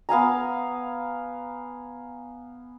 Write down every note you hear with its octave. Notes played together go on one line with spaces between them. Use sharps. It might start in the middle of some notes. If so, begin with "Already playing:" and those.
B3 F5 G#5 A#5